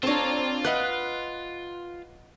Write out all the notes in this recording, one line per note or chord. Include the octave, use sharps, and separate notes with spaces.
C4 D4 F4 A4 C#5 A5 A#5
B4 D#5 F#5 D#6 F#6